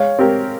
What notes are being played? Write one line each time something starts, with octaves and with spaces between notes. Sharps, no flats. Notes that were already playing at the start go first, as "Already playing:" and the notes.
Already playing: G#3 C#5 F5
C4 G4 A#4